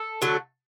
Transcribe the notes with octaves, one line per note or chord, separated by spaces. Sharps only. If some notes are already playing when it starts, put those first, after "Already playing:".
Already playing: A4
D3 F#3 A3